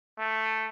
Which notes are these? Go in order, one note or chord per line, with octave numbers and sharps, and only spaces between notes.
A3